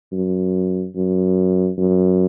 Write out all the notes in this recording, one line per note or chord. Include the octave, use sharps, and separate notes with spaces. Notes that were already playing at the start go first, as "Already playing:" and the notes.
F#2
F#2
F#2